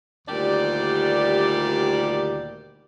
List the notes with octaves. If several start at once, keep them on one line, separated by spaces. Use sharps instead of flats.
D2 A#2 D#3 G3 G4 D5